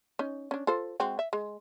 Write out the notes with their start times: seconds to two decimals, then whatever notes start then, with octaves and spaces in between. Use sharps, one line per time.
0.19 C#4 D#4
0.51 C#4 D4
0.67 F4 A4 C5
1.00 G#3 C4 F#4
1.19 E5
1.33 G#3